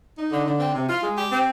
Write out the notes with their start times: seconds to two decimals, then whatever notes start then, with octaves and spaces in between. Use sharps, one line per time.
0.17 D#4
0.32 D3
0.46 D3
0.60 C4
0.75 C3
0.89 F4
1.03 G#3
1.17 G4
1.32 C4